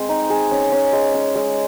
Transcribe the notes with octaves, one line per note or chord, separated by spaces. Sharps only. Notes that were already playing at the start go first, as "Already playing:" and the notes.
Already playing: G#3 C4
D#4
G#4
C#4
C#4
G#3
C#4
G#3